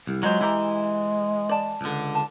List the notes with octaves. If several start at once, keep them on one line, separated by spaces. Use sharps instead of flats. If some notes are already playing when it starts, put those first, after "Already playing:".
C2
F#3 G#3 F4 C5
E3 E4 G4 A#5
D5 A5
C#2 D3
A5